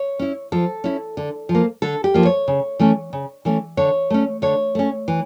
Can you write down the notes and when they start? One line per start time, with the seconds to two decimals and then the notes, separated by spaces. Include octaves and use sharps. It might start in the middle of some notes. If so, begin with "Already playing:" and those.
Already playing: C#5
0.19 C#4 E4
0.52 F3 A4
0.84 C#4 E4
1.17 D3
1.49 F3
1.55 A#3
1.82 D3 A4
2.04 G4
2.14 F3 A#3
2.25 C#5
2.48 C#3
2.79 E3 A3 C#4
3.13 C#3
3.45 E3 A3 C#4
3.77 D3 C#5
4.10 A3 C#4
4.42 D3 C#5
4.75 A3 C#4
5.08 E3